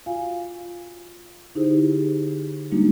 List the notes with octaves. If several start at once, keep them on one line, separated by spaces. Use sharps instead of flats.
F4 F#4 F5 G#5
D3 D#4 E4 G4 G#4 C5
G3 G#3 A#3 D4 D#4 F#4